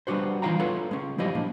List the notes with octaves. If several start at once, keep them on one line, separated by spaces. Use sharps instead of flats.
G3 B3 D4 F#4 C5
E3 D#4 F4 F5 G5 A#5
B3 F4 A4 B4 C#5
G#3 C#4
F3 G3 E4 G4 D#5
F3 A#3 D4